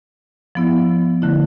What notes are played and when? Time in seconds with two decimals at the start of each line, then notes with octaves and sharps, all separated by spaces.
0.55 F3 B3 E4
1.22 D3 A3 E4